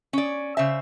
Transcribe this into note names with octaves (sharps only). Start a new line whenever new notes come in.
C#4 D5
C#3 C5 E5